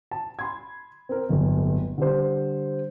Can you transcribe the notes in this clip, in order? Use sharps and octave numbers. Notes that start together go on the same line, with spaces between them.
A5
B5 C6 G#6
C4 A#4
D1 G1
D3 G3 C5